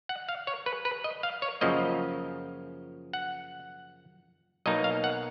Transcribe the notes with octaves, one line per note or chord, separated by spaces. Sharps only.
F#5
F5
C#5
B4
B4
D#5
F5
C#5
F#2 C#3 F3 A#3 D#5
F#5
B1 B2 A#3 D#4 D#5
F5
F#5